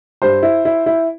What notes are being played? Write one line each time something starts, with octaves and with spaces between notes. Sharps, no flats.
G2 C5
E4
E4
E4